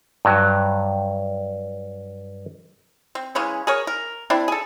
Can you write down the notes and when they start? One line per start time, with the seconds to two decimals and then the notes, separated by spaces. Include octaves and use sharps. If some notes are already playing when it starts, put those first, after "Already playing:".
0.25 G2 F#3
3.15 C4
3.35 C#3 E3 G#3 C#4
3.67 G#4 A#4 C#5
3.87 A#4
4.30 C4 D4 E4
4.48 G#4 A4